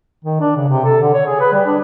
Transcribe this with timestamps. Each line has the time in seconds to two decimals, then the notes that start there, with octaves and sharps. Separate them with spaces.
0.24 D#3
0.40 D4
0.56 C#3
0.68 C3
0.84 A4
1.00 D3
1.14 C#5
1.26 G#4
1.40 B4
1.52 G3
1.66 D4